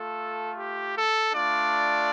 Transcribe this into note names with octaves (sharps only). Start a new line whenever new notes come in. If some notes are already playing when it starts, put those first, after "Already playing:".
Already playing: A3 F4 A4
G4
A4
A3 D4 F4 D5